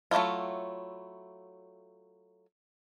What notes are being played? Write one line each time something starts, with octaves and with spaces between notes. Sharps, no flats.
F#3 A3 A#3 E4 F4